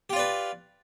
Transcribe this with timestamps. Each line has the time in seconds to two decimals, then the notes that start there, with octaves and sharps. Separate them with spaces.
0.10 G4
0.13 F4
0.16 D5
0.19 B4